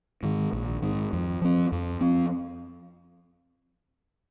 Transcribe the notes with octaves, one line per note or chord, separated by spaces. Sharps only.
G#2 D#3
A#1
G#2 D#3
F2
F3 C4
F2
F3 C4